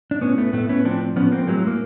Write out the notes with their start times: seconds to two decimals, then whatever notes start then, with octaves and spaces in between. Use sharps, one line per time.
0.11 D4
0.21 A2 B3 C#4
0.38 A3 B3
0.53 A2 A3 B3
0.69 B3 C#4
0.85 F3 C4 D4
1.16 F3 B3 C#4
1.32 A#3 C4
1.47 A2 F#3 G#3
1.67 A#3